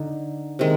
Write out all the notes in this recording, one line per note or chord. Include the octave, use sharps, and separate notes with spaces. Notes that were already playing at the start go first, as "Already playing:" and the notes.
Already playing: D3 D#4
C3 D#3 G#3